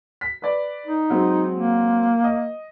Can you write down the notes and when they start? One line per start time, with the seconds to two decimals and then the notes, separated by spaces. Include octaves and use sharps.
0.21 B6
0.42 B4 D5
0.86 D#4
1.10 F#3 G#3 C4
1.54 A#3
2.24 D#5